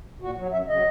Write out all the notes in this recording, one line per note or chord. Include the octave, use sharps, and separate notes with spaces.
A#2 F#4
F#3
F#2 E5
C#3 F#3 D#5